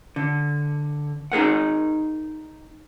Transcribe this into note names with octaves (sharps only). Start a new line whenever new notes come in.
D3
D#4 G#4 A#4 F#5